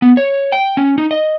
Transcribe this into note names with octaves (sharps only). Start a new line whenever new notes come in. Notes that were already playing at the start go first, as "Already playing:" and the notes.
B3
C#5
G5
C#4
D#4
D#5